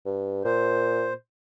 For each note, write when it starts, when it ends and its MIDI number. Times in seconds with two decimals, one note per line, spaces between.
0.05 0.45 43
0.45 1.13 46
0.45 1.13 72